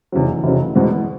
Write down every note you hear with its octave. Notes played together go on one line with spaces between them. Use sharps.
F1 E2 C#3 F#3
F1 E2 C#3 F#3
E2 B2 G#3 B3